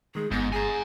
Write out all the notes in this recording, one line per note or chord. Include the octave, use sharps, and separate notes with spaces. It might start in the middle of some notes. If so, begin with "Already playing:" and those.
D#3 G#3 G#4
G1 G#2 G#3 B3 A#6
G#4 G#5 A#5